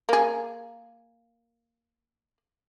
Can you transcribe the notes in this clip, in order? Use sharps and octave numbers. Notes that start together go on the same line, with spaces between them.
A#3 G#4